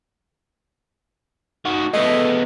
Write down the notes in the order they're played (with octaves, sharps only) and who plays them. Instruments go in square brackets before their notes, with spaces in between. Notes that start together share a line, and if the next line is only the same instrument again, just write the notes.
[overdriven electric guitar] D#3 F#4
[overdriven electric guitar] G#3 B3 [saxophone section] A3 D#5